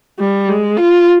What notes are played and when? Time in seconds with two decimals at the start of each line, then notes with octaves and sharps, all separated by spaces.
0.20 G3
0.49 G#3
0.77 F4